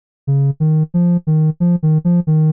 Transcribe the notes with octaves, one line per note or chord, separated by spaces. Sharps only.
C#3
D#3
F3
D#3
F3
D#3
F3
D#3